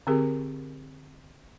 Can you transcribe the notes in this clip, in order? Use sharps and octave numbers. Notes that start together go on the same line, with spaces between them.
D3 C4 G4 G#4 A#4